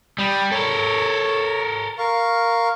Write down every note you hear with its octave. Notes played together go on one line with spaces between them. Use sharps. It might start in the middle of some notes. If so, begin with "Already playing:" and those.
G3 B5 D#6
A4 A#4 C#5
A#4 F5 C#6